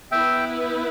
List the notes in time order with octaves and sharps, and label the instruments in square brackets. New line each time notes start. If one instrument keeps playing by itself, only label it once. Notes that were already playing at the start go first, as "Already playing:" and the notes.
[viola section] B3 E4 B4 [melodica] E5 G5